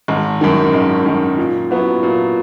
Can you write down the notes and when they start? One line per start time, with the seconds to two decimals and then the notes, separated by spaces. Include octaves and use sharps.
0.08 G#1
0.41 F#2 D#3
0.73 G#1
1.05 F#2 D#3
1.38 A#2
1.71 F#3 B3 E4
2.03 A#2